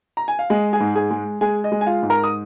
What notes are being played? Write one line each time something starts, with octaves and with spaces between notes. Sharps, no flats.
A#5
G#5
F5
G#3 D#5
G#4 G#5
G#2
G#4 G#5
G#3
G#3 G#4 G#5
D#5
G#3
G#5
F4 F5
G#2
A#4 A#5
D#6